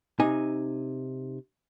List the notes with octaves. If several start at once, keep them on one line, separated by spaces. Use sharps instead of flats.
C3 D#4 G#5